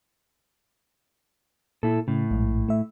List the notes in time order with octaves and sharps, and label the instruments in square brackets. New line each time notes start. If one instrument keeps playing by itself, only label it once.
[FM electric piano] A#2 [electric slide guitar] E4 A4
[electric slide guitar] A2 [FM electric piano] C#3
[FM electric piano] A#1 G#2
A3 E5